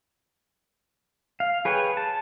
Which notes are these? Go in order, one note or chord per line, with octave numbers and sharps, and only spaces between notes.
F5
G#4 B4 C#5 G5 G#5
A5